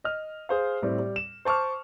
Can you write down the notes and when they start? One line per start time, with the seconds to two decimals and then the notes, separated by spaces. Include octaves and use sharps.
0.04 D#5 F6
0.49 G#4 C5 F5
0.82 A2 G3 C4
0.99 G3
1.16 E7
1.45 C5 A5 C#6 D6 F6